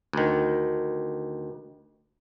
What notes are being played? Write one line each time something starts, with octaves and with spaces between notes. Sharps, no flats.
D2 D#3